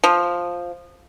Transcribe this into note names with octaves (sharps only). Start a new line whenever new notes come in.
F3